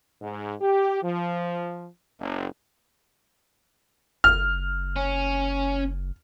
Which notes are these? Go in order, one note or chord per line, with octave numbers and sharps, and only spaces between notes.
G#2
G4
F3
F#1
F#1 F6
C#4